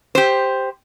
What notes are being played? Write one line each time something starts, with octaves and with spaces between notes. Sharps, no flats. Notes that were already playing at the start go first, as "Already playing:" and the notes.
G4 C5